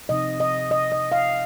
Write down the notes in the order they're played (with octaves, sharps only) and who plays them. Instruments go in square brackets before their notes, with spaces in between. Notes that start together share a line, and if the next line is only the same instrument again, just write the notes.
[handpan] C3 F3 C4 D#4 D#5
D#5
D#5
D#5
F5